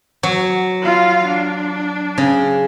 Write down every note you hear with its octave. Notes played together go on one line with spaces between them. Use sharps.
F#3
F4 F5
D4
C#3